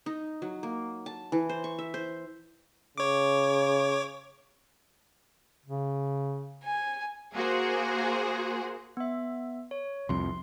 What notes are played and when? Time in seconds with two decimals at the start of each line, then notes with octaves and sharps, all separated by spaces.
0.06 D#4
0.42 F#3
0.63 A#3
1.06 A5
1.32 E3
1.49 C5
1.64 C#6
1.79 E5
1.94 C5
2.98 C#3 C#5 D6
5.66 C#3
6.63 G#5
7.34 A#3 F#4 G#4 C5
8.97 B3 E5
9.71 C#5
10.09 C2 F2 C6